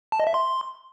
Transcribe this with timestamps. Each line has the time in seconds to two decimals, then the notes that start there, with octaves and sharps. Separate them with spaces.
0.12 A5
0.20 D#5
0.27 E5
0.34 C6